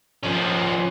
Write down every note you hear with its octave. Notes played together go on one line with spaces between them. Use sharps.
F3 C#4